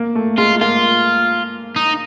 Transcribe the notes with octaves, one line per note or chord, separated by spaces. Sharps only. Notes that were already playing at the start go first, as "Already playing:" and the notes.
Already playing: A#3
A3
G#3 F4
A#3 F4
D#4